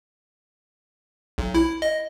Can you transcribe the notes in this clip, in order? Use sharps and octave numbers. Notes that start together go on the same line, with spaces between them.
B1
E4
D#5